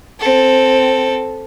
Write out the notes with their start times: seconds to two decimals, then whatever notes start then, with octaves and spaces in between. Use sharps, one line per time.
0.20 C4 A4